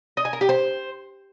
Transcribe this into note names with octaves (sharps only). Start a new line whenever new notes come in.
D#5
G#5
A#4
G4
C5